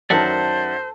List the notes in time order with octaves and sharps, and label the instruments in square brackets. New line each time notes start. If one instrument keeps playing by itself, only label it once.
[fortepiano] F#2 D#3 [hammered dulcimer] A4 [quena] C5 [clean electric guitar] D5 E5 F#5